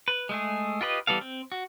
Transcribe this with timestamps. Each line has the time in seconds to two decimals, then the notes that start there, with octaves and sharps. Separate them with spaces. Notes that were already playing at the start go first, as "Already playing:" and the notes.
0.08 B4
0.29 G#3 A3 G#4
0.81 F4 G4 B4 D#5
1.07 E3 G3 B3 A4 F5
1.21 C4
1.52 F#4